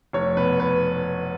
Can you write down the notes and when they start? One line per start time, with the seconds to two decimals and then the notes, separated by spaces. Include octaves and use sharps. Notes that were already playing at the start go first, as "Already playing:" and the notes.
0.13 F1 C#5
0.37 B2 B4
0.60 B4